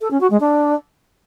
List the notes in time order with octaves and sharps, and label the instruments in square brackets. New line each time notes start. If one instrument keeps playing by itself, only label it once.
[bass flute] A4
C#4
F#4
G#3
D4